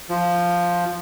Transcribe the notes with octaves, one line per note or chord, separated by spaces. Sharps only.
F3